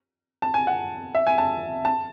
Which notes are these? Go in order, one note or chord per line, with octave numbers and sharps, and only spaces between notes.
A5
G#5
F#5
E5
G#5
A5
A5